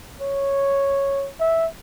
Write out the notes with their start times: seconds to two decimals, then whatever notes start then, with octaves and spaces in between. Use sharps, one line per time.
0.21 C#5
1.40 E5